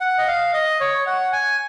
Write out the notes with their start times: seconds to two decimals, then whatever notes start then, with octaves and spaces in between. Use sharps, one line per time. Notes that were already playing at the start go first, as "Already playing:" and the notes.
0.01 F#5
0.18 D#5
0.27 F5
0.54 D#5
0.80 C#5
1.07 F#5
1.33 G#5